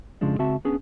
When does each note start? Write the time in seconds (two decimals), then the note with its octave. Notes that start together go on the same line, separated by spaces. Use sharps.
0.21 F2 C#3 F3 G#3 D4
0.39 C#2 C4 F#4 E5 A5
0.65 B3 C#4 D4 G#4